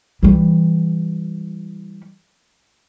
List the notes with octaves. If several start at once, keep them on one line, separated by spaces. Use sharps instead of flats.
E3 G3